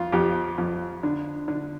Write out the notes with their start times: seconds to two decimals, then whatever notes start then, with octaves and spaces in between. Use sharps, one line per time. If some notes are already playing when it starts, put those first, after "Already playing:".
Already playing: F2 F4
0.12 F2 G4
0.58 F2
1.03 D3
1.48 D3